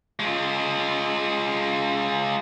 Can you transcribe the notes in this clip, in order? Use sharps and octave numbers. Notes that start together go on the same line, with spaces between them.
G#3 F4